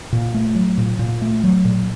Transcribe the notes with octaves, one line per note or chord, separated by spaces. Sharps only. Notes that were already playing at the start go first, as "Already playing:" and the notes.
A#2
A3
F#3
A#2
A#2
A3
F#3
A#2